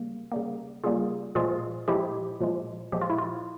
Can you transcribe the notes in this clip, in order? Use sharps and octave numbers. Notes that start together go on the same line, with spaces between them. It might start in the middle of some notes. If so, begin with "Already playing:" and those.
Already playing: C#3 G3 A#3
C#3 G3 A#3
C#3 G3 A#3 F4 G#4
A#2 F3 G#3 F4 G#4
A#2 F3 G#3 E4 G4
A#2 F3 G#3
A#2 F3 G#3 G4
F4
E4
F4